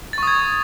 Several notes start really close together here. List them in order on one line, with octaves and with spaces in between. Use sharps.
A6 C#6 D#6 G#6